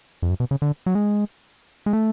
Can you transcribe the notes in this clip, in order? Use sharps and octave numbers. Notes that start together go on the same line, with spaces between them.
F2
F#2
B2
C#3
D3
F#3
G#3
G#3
A3